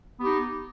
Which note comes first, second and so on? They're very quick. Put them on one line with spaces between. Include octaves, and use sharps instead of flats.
B3 G4 D#4